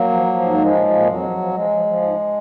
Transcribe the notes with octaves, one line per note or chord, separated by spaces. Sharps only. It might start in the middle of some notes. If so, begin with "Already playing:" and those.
Already playing: F#3 A#3
F3
F3
G#2
F3 G#3
A#2
A#2
F2 F#3
F3
F3
F3 G#3
F3
F3
G#2